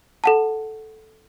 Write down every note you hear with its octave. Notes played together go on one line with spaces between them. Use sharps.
A4 F#5 A5